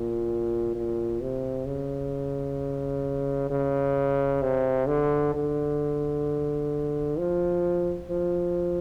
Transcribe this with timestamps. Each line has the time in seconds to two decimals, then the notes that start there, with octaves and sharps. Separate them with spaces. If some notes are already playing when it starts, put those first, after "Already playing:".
Already playing: A#2
0.75 A#2
1.21 C3
1.66 C#3
3.50 C#3
4.42 C3
4.87 D3
5.35 D3
7.18 F3
8.10 F3